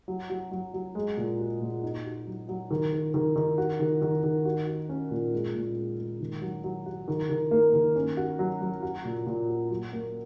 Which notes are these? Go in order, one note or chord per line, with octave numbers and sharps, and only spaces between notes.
F#3
F#3
F#3
F#3
G#3
A#2
F#4
A#2
D#4
F#4
F#3
F#3
D#3
D#3
D#3
D#3
F#4
D#3
D#3
D#3
F#4
F#4
C#4
A#2
G#3
A#2
G#3
G#3
D#3
F#3
F#3
F#4
D#3
D#3
A#3
D#3
C#4
F#4
F#3
F#3
F#4
A#2
A#2
F#4
F#3
A#3